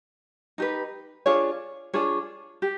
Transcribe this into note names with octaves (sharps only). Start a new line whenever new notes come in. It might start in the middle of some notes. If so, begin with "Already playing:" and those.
D#4 G4 B4
D4 F4 G#4 C#5
D4 F4 G#4 C#5
G4